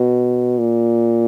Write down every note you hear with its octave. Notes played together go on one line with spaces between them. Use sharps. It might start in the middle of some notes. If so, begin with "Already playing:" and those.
Already playing: B2
A#2